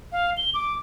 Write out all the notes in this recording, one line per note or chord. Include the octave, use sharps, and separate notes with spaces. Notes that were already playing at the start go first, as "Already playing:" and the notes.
F5
G7
D6